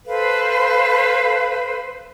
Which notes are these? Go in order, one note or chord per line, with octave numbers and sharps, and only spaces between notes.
A4 B4 C5 F5